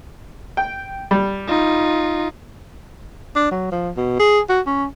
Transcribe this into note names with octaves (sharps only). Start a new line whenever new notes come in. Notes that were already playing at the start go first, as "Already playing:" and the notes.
G5
G3
D#4 F4
D4
F#3
F3
B2
G#4
F#4
C#4